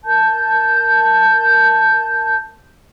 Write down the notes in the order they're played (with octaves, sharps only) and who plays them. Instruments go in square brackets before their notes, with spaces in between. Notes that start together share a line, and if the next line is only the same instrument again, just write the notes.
[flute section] A#4 A5 G6